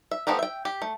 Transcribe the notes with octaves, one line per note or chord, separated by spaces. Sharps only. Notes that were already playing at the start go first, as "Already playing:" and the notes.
E5
F3 A3 B3 G4 A#4
E5 G5
G4
A3